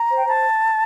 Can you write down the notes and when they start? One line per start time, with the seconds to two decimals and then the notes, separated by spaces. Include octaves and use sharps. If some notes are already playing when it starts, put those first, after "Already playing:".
Already playing: A#5
0.10 C5
0.17 G5
0.26 C5 A5